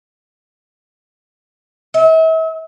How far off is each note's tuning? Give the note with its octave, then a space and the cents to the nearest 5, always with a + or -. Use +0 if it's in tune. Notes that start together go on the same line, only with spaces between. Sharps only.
E5 -40